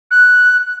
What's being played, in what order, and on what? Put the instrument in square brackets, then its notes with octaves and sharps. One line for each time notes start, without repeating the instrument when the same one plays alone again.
[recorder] F#6